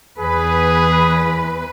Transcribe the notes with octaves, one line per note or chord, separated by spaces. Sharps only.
E2 G#4 B4